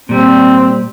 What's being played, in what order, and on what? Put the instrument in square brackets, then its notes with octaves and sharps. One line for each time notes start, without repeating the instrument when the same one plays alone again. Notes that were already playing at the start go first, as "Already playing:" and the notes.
[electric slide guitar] A#2 G3 [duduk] C4